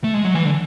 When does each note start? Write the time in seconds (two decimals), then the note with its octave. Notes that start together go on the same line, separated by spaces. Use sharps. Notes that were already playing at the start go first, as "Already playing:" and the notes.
0.04 A3
0.14 G#3
0.24 F#3
0.34 E3
0.45 D3